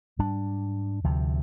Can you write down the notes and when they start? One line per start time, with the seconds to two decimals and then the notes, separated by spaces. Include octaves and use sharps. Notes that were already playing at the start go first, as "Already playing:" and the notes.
0.19 G#2 G3 D4
1.04 D2 C3 F3